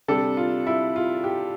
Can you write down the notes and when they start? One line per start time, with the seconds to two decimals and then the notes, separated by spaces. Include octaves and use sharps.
0.08 C3 G3 D4 A4
0.37 F4
0.67 E4
0.96 F4
1.24 G4